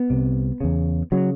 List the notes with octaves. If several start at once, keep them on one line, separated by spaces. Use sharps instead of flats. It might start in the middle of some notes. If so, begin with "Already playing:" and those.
Already playing: B3
C2 C3
E2 C#3
C#3 F#3